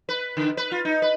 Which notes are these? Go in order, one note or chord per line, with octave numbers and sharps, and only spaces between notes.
B4
D3
B4
F4
D#4
B4